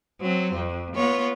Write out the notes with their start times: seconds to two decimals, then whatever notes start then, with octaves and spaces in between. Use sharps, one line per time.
0.20 F#3 C4
0.54 F2
0.94 B3 F4 C#5